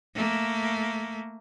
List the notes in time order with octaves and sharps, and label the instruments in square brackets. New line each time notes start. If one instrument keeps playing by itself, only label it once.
[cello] A3 A#3